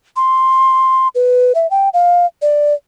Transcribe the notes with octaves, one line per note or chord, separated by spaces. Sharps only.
C6
B4
E5
G5
F5
D5